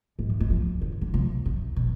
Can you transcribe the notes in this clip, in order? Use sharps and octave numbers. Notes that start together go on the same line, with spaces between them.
G#2
A3
G#3
F3
D3
D3
C3
C3
B2